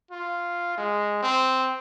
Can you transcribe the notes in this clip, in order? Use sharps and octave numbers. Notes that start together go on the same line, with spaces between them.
F4
G#3
C4